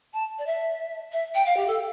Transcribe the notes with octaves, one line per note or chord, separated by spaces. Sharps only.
A5
D5
E5
E5
G5
F5
G4
A4